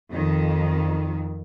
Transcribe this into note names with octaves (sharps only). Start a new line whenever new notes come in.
F2 D#3